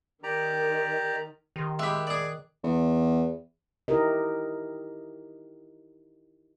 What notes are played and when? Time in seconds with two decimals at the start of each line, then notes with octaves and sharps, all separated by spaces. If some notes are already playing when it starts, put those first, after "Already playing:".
0.24 D#3 G4 D5 A#5
1.56 D#3 G4 A#4 C6
1.79 G#3 G4 E5 B5 D6 F#6
2.07 G#4 D5
2.64 E2
3.88 D#4 E4 G4 A#4 D#5